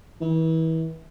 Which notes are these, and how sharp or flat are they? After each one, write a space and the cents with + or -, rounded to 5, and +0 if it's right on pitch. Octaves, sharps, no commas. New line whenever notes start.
E3 -35